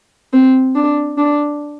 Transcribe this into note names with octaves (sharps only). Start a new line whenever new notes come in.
C4
D4
D4